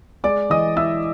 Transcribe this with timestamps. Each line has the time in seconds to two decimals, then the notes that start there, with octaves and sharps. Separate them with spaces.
0.24 G#3 D5 D6
0.50 E3 D#5 D#6
0.76 E4 E5 E6